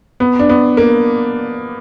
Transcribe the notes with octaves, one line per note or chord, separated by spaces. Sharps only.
B3
D4
B3
A#3